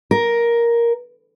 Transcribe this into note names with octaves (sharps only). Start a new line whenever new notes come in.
A#4